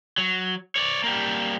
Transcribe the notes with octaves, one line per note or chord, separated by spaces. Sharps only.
F#3
C#5 D5
G3 A#3